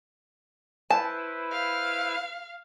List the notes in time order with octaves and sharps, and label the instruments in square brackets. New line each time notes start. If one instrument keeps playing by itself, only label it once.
[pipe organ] E4 B4 C5 [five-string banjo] A5
[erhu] F5